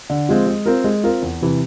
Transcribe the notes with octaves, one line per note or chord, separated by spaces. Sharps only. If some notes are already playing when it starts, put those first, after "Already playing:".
D3
F3 G#3 C4
G#3
C4 F4 A#4
G#3
C4 F4 A#4
E2
C3 E3